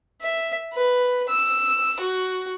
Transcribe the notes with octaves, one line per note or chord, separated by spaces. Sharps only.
E5
B4
E6
F#4